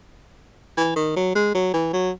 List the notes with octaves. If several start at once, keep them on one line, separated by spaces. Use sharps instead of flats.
E3
D#3
F#3
G#3
F#3
E3
F#3